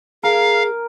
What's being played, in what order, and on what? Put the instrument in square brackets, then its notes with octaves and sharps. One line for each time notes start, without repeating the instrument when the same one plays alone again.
[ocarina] G#4 [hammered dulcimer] A#4 [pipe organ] F5